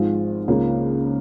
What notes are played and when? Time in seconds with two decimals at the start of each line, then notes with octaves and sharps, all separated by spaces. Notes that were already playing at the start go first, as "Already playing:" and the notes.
Already playing: G#1 G#2 F3 G#3 F4
0.48 C#2 C#3 A#3 F4